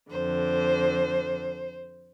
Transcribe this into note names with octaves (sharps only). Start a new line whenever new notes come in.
F2 D3 C5